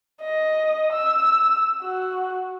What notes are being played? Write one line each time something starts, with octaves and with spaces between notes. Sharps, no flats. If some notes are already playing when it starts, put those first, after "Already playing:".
D#5
E6
F#4